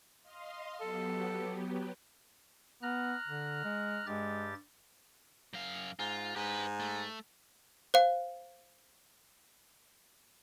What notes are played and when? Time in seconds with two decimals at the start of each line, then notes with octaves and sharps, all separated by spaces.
0.22 D#5 F5 C6
0.81 F#3 B3 G4 A4
2.83 B3 A#5 F6 F#6
3.28 D3
3.64 G#3
4.06 G2 G#3 G4 A6
5.53 F#2 F5
5.99 G#2 F4
6.36 G#2 G4 B4
6.80 A3
7.94 C5 F5